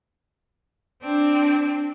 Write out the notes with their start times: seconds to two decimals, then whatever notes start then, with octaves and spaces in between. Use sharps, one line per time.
1.03 C4 D4